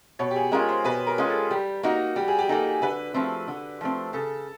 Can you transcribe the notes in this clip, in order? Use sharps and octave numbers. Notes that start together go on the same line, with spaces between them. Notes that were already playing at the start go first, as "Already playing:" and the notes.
B2 C#5
G4
G#4
G#3 C#4 F4 A#4
C5
B2 B4
A#4
G#3 C#4 F4
A4
G3 G4
A#3 D#4 F#4
G3 G4
G#4
G4
A#3 D#4 A4
D3 B4
F3 A3 C4
D3
F3 A3 C4
C#3 A4